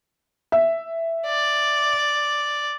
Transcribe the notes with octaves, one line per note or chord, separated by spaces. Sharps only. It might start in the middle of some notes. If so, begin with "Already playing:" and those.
E5
D5